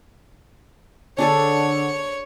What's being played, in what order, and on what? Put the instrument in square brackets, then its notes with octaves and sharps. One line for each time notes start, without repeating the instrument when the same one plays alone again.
[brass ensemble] D3 [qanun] D4 G#4 A4 [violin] C#5